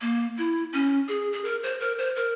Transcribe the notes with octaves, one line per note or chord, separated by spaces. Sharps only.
A#3
E4
C#4
G#4
G#4
A#4
C5
A#4
C5
A#4